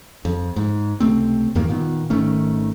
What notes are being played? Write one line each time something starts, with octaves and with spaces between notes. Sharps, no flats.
F2
G#2
C#2 C3 A3 C4
E2 G2 D#3 A#3
A#2 D#3 B3
G#1 D#3 A3 C#4